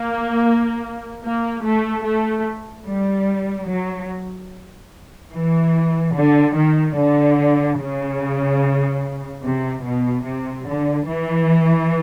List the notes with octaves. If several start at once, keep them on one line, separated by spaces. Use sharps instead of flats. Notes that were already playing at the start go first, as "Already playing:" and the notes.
Already playing: A#3
A#3
A3
A3
G3
F#3
E3
D3
D#3
D3
C#3
C3
B2
C3
D3
E3